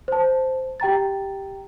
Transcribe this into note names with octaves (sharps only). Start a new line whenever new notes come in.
C5 A5
G4 G5 A#5 A6